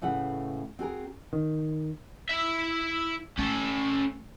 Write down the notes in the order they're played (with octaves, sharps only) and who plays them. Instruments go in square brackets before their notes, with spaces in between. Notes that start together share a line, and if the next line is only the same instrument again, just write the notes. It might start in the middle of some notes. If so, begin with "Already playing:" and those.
[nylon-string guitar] A2 C#3 A3 B4 F#5
C4 F#4 G#4 A#4
[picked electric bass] D#3
[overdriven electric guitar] E4 E5
[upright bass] A3 [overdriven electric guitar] C#4 A4